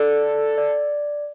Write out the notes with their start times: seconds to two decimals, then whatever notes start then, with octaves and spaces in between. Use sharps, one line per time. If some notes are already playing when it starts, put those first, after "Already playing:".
Already playing: A4 D5
0.58 D5